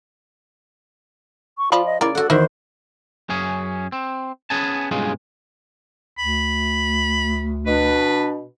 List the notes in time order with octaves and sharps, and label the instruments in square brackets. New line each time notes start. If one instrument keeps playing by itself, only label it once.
[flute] C#6
[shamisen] F3 D5 B5 [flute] F4
[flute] D#5
[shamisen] C#3 A#4 [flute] E4 [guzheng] D5
[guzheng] F#4 F#5 [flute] A4
[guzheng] E2 D#3 F#4 [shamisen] E4 [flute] C5
[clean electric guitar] F#2 C#4 G#4
C4
B3 C#4 G#4 G#5 A5
B1 G2 G#3 C#4 F4 G#4
[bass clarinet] D2 [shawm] B5
[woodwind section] B2 D4 [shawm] B4